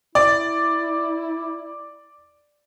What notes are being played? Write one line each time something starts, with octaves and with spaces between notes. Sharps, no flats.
E4 D5